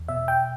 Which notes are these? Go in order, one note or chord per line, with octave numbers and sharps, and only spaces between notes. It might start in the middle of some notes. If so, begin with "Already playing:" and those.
Already playing: E2
B2 E5
G5